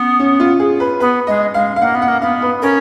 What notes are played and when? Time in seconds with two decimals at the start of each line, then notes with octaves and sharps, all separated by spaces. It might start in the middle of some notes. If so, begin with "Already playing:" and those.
Already playing: B3 C#4
0.20 C#4
0.40 F4
0.60 G#4
0.80 B4
1.00 B3 B4
1.27 G#3 D#5
1.54 G#3 F5
1.76 F5
1.81 A#3 F#5
1.95 B3
2.02 F#5
2.08 A#3
2.22 B3 F5
2.42 B4
2.62 C#4 A#4